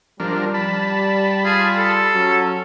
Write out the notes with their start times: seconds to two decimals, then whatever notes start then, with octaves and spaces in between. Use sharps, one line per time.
0.20 F3 G3 D4 A#4
0.54 A5 B5
1.45 F4 G#4
1.78 A4
2.15 F#3 C#4